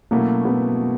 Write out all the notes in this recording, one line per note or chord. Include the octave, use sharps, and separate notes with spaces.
B2 F#3 A3 A#3 C#4 E4
B3